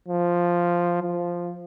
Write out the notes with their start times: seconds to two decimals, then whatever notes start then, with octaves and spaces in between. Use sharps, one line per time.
0.08 F3
1.03 F3